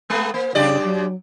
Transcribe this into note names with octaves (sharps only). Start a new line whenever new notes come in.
G#3 A3 B3
A#3 C5
F#2 C#3 G4 D5
F#3